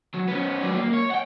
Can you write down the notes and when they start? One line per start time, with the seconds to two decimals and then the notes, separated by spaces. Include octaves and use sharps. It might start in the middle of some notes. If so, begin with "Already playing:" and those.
0.14 F#3
0.28 B3 C#4
0.63 F#3 D5
0.76 A#3
0.94 C#5
1.11 F#5 G5